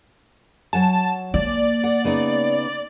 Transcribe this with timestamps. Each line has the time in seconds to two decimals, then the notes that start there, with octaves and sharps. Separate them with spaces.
0.73 F#3 F#5 G#5 A5
1.34 A#3 D5
1.84 F#5
2.04 C#3 B3 D#4